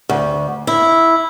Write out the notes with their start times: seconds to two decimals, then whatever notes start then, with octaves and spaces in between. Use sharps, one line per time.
0.09 D2
0.67 E4